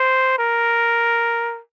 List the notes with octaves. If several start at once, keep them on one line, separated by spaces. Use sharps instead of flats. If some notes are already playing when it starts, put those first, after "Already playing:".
Already playing: C5
A#4